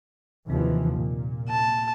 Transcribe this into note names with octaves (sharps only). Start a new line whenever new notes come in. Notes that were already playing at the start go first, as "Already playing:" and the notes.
D#2 C3 E3 F3
A#2
A5